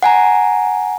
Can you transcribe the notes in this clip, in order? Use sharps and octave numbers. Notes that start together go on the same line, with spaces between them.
F#5 G#5 A#5